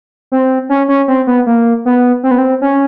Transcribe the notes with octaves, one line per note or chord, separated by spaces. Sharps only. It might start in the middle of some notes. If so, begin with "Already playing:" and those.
C4
C#4
C#4
C4
B3
A#3
B3
C4
B3
C4
C#4